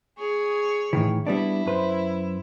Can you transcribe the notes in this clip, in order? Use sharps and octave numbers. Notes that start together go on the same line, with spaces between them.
G#4 C#5
A2 D#3 E3
G3 B3 D4 E4
F#2 B4 C5